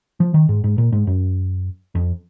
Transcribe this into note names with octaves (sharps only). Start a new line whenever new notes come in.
F3
D#3
G#2
G#2
A#2
G#2
F#2
F2